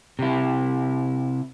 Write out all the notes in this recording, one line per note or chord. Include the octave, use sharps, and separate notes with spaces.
C3 E4